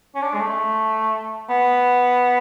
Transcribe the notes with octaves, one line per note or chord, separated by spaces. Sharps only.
C#4
D4
G#3
A3
B3